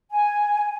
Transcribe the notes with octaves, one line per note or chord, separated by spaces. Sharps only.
G#5